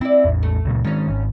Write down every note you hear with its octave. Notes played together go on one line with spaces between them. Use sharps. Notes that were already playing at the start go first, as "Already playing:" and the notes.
C4 E4 D5
A1 E2
A3
C#2 A#2
D#3 G#3 C#4 C#5
G#1